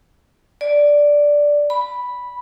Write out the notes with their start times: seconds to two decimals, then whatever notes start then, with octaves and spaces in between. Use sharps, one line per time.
0.61 D5
1.70 B5